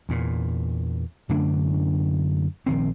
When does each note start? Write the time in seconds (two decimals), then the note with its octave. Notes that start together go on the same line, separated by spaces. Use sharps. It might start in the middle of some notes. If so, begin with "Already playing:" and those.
0.09 E2 A#2
1.29 F#2 D3 A3 D4
2.66 A#1 D#3 C4